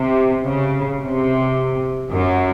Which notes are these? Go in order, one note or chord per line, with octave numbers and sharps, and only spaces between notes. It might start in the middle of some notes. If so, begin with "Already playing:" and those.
Already playing: C3
C#3
C3
F#2